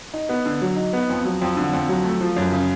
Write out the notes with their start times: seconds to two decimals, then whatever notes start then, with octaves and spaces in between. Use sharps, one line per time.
0.14 D#4
0.29 B3
0.46 D3
0.62 F#3
0.77 D#4
0.93 B3
1.09 F2
1.25 F#3
1.42 F2
1.57 D3
1.73 F2
1.89 F#3
2.04 A3
2.21 F3
2.36 F#2
2.52 C#3